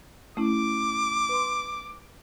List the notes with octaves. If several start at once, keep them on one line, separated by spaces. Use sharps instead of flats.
A3 C#4 E4 D6
B4 C6